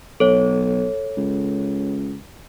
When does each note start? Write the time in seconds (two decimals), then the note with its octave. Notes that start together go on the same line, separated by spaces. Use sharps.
0.20 B1 A4 C#5
1.17 C#2